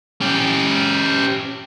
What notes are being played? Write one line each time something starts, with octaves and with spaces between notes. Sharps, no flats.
C#4 G4